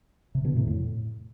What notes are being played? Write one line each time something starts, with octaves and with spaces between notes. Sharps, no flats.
C3
B2 D3
A2 C3
F2 A2